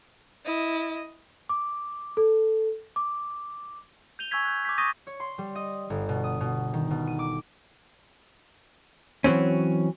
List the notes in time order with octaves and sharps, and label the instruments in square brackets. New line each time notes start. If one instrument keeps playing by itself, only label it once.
[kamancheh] E4 D#5
[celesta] D6
A4
D6
[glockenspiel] G6 D#7 F7 G7
G#5 C#6 E6 G6 G#6 B6
F#6 G6
D6 G6 B6
C#6 D#6 G6 A6 A#6 D#7
[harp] C#5
C6
G3
D#5
G1
B2
D#6
B2
D#3
B2
D#7
D6
[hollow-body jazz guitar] E3 F#3 C4 C#4